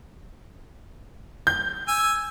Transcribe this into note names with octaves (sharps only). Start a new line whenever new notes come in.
G6
G#5 E6